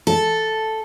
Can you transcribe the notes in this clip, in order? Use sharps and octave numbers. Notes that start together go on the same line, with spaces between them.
A4